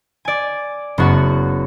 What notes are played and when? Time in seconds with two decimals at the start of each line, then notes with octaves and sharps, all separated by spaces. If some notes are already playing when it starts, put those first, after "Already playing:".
0.25 D5 G#5
0.98 F#1 B3 F#4 F#5